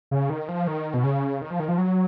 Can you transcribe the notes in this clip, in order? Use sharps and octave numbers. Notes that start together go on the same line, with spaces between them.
C#3
D#3
F3
D#3
B2
C#3
D#3
F3
D#3
F3
F#3